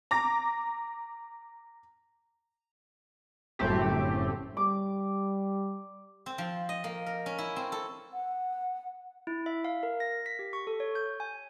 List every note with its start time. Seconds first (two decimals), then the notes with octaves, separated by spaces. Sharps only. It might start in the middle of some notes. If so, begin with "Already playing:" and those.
0.11 A#5 D6 A#6
3.59 G1 F#2 A2 A3 C4 G4
4.57 G3 D6
6.26 C4
6.38 F3
6.69 D#5
6.84 A#3
7.06 A#4
7.26 C#4
7.38 E4
7.56 C4
7.72 A4
8.13 F#5
9.27 E4
9.46 E5
9.65 F5
9.83 A#4
10.00 A#6
10.26 B6
10.39 G4
10.53 C#6
10.67 A4
10.80 C#5
10.95 G6
11.20 G#5